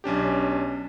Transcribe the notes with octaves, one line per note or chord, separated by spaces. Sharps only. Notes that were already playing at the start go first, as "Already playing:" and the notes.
B1 C#4 D4 G4